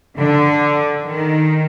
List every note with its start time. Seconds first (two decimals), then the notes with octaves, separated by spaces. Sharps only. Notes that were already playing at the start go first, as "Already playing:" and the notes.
0.17 D3
1.04 D#3